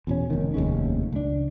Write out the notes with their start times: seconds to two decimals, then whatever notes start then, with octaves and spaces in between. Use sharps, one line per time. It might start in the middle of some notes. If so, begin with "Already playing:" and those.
0.07 E2 B2 C#4
0.30 F1 D#3
0.54 F1 D#2 G#3 C#4
1.12 C#2 D4